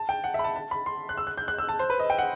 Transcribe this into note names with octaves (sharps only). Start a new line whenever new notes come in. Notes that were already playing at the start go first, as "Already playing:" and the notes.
Already playing: A5
G5
F#5
E5 B5
A5
A5
B5
C6
F#6
E6
F#6
G6
F#6
E6
A5
C5
B4
D#5
G5
F#5